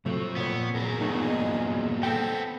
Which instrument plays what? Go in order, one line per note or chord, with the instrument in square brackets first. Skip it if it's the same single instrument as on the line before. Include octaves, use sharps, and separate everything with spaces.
[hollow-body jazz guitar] C3 F#3 A3 [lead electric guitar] F3 C4
[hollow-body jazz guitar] A#2 C#5 [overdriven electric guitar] B3
[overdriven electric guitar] E2 F#3 [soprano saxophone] G#4 [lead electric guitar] A#4
[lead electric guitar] G2 A#2 [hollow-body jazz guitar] A3 B3 D#4
[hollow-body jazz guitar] D#5
[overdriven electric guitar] B3 C4 [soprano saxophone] A4 [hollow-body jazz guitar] G5